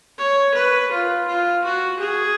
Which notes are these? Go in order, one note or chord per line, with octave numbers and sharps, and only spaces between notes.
C#5
B4
F4
F4
F#4
G#4